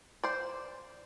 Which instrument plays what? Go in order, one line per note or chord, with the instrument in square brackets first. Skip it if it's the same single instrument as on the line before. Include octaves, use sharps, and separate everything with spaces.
[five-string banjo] C5 D5